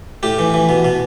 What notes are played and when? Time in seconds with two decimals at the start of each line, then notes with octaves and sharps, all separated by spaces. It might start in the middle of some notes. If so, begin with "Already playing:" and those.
0.23 A2 G4
0.39 E3
0.54 E3
0.69 B2
0.85 B2